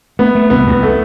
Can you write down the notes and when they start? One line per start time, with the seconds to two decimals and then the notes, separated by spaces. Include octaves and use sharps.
0.19 A3 B3
0.35 A3
0.50 C2 B3
0.67 C2
0.83 A3